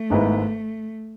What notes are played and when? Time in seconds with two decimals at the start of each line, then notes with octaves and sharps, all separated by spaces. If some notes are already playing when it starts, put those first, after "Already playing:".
Already playing: A3
0.10 G#1 G#2 G#3 B3 E4